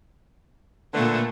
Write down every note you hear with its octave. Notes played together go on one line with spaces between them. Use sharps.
A#2 D3 A3 B4